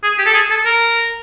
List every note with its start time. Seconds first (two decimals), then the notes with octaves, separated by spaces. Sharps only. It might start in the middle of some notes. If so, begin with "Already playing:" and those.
0.03 G#4
0.18 G4
0.26 A4
0.34 G#4
0.50 A4
0.65 A#4